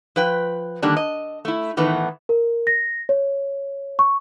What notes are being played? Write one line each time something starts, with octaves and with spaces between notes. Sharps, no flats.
F3 B4 G5
D3 D#3 G3 A#3 D4
D#5
A3 E4
A2 D#3 E3 A3 B3
A#4
A#6
C#5
C#6